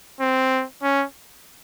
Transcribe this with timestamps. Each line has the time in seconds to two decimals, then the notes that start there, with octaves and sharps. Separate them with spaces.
0.20 C4
0.83 C#4